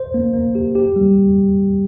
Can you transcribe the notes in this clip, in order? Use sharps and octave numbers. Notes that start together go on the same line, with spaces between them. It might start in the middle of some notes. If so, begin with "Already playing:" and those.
Already playing: C5
A#3
A#3
G4
G4
G3